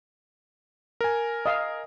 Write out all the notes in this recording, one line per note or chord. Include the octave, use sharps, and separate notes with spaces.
A#4 G#5
D#5 F5